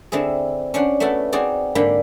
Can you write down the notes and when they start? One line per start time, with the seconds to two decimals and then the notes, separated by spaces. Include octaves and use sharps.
0.12 D3 C4 E4 G#4
0.74 C#4 D4 C5 F#5
1.00 A3 B3 E4 F#4 A4
1.32 C4 D#4 F#4 G#4 C5 D5
1.75 G#2 D3 A#3 D4 G5 B5